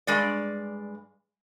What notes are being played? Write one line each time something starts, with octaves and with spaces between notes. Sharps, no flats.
G2 G#3 D5